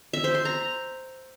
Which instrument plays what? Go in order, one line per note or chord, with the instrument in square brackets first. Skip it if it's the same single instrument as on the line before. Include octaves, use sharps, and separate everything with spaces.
[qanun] E5
C5
C6
A#5